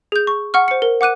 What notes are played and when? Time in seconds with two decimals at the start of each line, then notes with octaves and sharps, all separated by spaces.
0.12 G#4 G6
0.27 C#6
0.54 F#5 C#6 F6
0.68 C5 C#7
0.82 A#4
1.01 F#5 D6 F#6 D#7